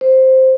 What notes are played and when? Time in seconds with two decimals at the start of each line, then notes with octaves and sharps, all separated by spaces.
0.01 C5